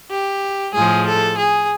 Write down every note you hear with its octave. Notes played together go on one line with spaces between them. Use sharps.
G4
A2 F3 G#3 G#4
A4
G#4